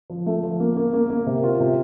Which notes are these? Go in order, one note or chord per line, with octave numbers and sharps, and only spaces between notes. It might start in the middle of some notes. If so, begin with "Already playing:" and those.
F3
A3
F3
A#3
A#3
A#3
A#3
C3
F4
C3